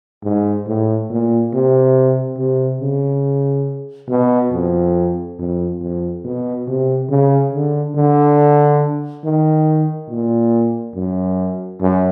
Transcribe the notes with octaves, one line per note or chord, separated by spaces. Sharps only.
G#2
A2
A#2
C3
C3
C#3
B2
F2
F2
F2
B2
C3
C#3
D3
D3
D#3
A#2
F#2
F#2